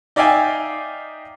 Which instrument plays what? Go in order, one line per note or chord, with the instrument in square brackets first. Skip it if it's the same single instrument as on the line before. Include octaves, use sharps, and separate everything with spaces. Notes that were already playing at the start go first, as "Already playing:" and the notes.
[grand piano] D#4 D5 E5 F5 G5 G#5